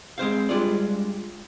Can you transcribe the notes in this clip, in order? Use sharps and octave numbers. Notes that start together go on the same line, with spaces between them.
G#3 C4 C5 F5
G3 G#3 D4 F4 D5